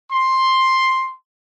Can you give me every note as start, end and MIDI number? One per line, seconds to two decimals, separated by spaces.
0.11 1.13 84